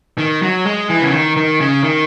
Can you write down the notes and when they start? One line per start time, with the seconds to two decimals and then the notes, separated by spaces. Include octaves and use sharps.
0.18 D#3
0.42 F#3
0.65 G#3
0.89 E3
1.01 C#3
1.12 D#3
1.37 D#3
1.60 C#3
1.83 D#3